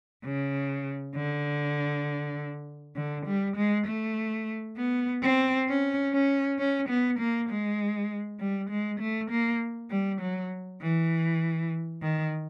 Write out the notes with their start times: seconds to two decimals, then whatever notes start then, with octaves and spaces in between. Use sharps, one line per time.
0.25 C#3
1.16 D3
2.96 D3
3.26 G3
3.56 G#3
3.87 A3
4.77 B3
5.23 C4
5.68 C#4
6.13 C#4
6.59 C#4
6.89 B3
7.19 A#3
7.49 G#3
8.40 G3
8.70 G#3
9.00 A3
9.30 A#3
9.90 G3
10.21 F#3
10.82 E3
12.02 D#3